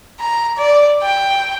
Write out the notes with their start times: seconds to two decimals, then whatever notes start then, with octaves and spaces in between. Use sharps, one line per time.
0.20 A#5
0.57 D5
1.02 G5